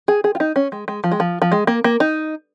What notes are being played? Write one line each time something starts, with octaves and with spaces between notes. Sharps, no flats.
G#4
G#4
F4
D#4
C#4
G#3
G#3
F3
G#3
F3
F3
G#3
A#3
A#3
D#4